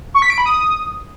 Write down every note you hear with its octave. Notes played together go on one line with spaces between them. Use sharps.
C#6
B6
D7
B5
D#6